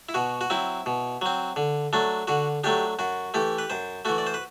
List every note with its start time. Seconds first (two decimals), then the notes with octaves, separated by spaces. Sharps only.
0.09 E4
0.14 B2 F#4
0.41 F#4
0.50 F#3 C4 E4
0.86 B2
1.22 F#3 C4
1.56 D3
1.93 F#3 A3 D4
2.27 D3 F#4
2.64 F#3 A3 D4 G4
2.99 F#2 F#4
3.34 E3 A3 G4
3.59 B4
3.70 F#2 C5
4.05 E3 A3 F#4
4.18 D5
4.27 C5
4.34 B4